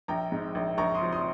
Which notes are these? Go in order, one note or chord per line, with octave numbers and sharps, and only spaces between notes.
A#1 G5 A#5
G#2
A#1
A#1 A#5 C#6
C6 D#6
F3
C6 D#6